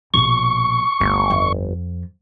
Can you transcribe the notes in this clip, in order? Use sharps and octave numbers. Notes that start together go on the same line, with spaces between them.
A#1 B2 C#6
G1 D2
F2